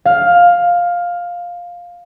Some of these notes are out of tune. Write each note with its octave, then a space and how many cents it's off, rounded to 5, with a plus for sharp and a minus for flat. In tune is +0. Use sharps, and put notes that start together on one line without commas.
F5 +10